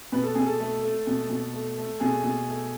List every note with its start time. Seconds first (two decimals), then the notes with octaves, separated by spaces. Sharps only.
0.12 B2 B4
0.23 A4
0.35 B2 G#4
0.46 A4
0.60 A3
0.83 A3
1.07 B2
1.30 B2
1.53 A3
1.78 A3
2.00 B2 G#4
2.24 B2
2.48 A3